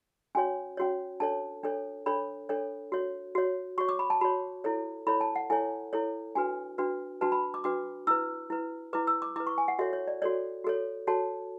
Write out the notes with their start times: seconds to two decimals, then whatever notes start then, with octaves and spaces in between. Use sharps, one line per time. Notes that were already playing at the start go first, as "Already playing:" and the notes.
0.35 C#4 F#4 C#5 G#5
0.77 C#4 F#4 C#5
1.20 D4 A4 C#5 A5
1.64 D4 A4 C#5
2.06 D4 A4 C#5 B5
2.49 D4 A4 C#5
2.92 F#4 C#5
3.35 F#4 C#5
3.78 F#4 C#5 C#6
3.89 D6
3.99 B5
4.10 A5
4.21 F#4 C#5 B5
4.64 E4 A4 C#5
5.07 E4 A4 C#5 B5
5.21 A5
5.36 F#5
5.50 E4 A4 C#5 G#5
5.93 E4 A4 C#5
6.35 D4 F#4 B4 G#5
6.78 D4 F#4 B4
7.21 D4 F#4 B4 A5
7.32 B5
7.54 D6
7.64 D4 F#4 B4 D6
8.07 E4 B4 E6
8.50 E4 B4
8.93 E4 B4 D6
9.07 E6
9.22 D6
9.36 E4 D6
9.40 B4
9.47 C#6
9.58 G#5
9.68 F#5
9.79 F#4 A4 C#5 E5
9.93 C#5
10.07 D5
10.22 F#4 A4 C#5 D5
10.64 F#4 A4 C#5
11.07 F#4 A4 C#5 A5